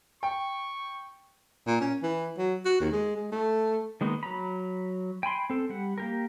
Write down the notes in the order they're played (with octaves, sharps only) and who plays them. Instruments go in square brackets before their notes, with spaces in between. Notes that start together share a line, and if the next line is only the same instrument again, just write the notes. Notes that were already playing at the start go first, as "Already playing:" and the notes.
[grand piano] G5 [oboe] C#6
[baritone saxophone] A#2
C#4
E3
F#3
F#4
D#2
G#3
G#3
A3
[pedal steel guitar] D#3 G#3 A#3 B3 D#4
F#3 A#5 B5
G5 G#5 B5 C6
C4 A4
G3 F#5
A#3 G4 A#4